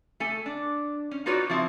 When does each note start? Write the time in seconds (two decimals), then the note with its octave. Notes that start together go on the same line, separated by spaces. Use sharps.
0.20 A3 A4 G#5
0.46 D4
1.11 C#4
1.26 D#4 F4 F#4 B4 C#5 D5
1.50 F3 C4 E4